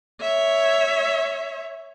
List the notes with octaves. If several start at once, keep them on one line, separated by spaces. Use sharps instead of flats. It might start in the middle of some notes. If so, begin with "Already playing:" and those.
C#5 E5